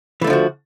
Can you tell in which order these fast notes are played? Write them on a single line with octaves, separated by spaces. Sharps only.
E3 A3 D3 F3 F#4